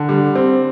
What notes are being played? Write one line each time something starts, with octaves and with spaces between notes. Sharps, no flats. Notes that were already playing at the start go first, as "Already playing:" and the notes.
Already playing: D3
G3
C4